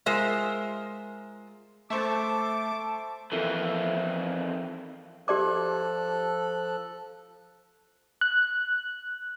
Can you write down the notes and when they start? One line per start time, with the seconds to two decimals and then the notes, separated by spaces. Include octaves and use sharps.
0.06 G#3 F4 A#4 C5 E5
1.90 A3 A4 C5 E5 A5 C#6 D6
3.32 F2 E3 A4 A#4 E5
5.28 F3 G4 A4 D5 D6 F#6
8.21 F#6